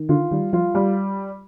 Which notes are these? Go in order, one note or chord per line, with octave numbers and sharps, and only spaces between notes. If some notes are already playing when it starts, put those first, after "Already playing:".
Already playing: D#3
D3 F4
D#3 G3
F3 F4
G3